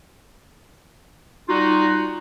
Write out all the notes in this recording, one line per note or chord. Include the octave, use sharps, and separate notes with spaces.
G3 D#4 F4 F#4